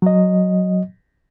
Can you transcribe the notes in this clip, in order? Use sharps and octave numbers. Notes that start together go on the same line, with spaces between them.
F#3 D#5